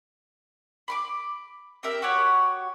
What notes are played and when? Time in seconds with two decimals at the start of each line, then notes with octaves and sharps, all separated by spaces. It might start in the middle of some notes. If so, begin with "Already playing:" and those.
0.88 B5 C6 D6
1.83 C4 G4 A#4 E5
2.02 F#4 G4 C#5 F#5